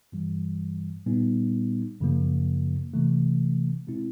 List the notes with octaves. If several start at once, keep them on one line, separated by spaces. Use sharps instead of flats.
G2 E3 G3
A#2 G3 B3 D#4
F#2 C#3 F3 A#3
C3 E3 A3
B2 G#3 C4 E4